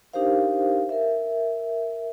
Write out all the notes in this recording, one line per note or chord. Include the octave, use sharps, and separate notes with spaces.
D4 D#4 G4 A#4 C5 F5
A#4 E5